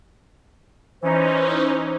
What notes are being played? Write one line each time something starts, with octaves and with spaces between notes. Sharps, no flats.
E3 C#4 D#4 C5